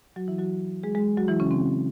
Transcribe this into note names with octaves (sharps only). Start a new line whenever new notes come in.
F#3 F#4
E3 E4
F#3 F#4
G#3 G#4
G#3 G#4
F#3 F#4
E3 E4
C#3 C#4
C4